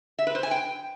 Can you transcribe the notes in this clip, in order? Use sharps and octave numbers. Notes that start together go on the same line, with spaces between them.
E5
B4
C5
G#5
G5